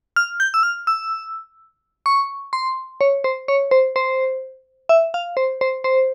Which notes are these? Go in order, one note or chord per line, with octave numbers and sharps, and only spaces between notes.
F6
G6
E6
F6
E6
C#6
C6
C#5
C5
C#5
C5
C5
E5
F5
C5
C5
C5